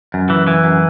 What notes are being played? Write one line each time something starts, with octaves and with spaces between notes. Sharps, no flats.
F#2
E3
E3
F#2